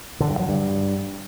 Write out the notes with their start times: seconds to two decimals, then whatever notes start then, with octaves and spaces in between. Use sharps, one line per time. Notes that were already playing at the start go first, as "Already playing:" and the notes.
0.20 D3
0.30 G2
0.39 F#3
0.49 G2